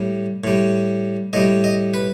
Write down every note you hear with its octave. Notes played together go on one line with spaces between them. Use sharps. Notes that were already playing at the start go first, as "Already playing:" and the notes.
Already playing: A2 G3
A2 G3
A2 G3 D#5
D#5
B4